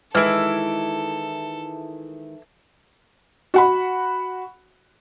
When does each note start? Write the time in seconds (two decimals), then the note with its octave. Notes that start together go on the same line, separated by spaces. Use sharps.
0.15 D#3 E3 G#3 E4 A4 F6
3.54 F#4 F#5 B5